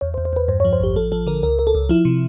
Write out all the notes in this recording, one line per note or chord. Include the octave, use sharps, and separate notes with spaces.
E2 C#5
C5
E2
C5
E2 B4
G2 C5
C#5
F3
C5
A1 G4
F3 A4
F3 A4
D3 A#4
C#2 A#4
C#2 A#4
A4
C#2
F3 E4
C3